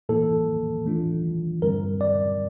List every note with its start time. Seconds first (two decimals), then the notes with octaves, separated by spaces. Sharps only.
0.09 A2 E3 A#3 E4 A4
0.86 E3 A3 D4 F4
1.62 G2 D3 G3 C4 A#4
2.01 D5